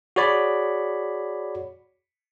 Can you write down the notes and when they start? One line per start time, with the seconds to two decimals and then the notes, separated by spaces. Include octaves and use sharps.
0.16 F#4 G#4 C#5 D5 B5